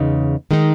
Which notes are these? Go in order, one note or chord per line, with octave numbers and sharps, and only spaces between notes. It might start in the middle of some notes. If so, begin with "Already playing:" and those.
Already playing: E2 C#3 G#3 D#4
D#3 G#3 D#4